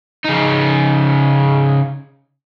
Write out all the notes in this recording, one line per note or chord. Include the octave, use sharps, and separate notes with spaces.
C#3 D#4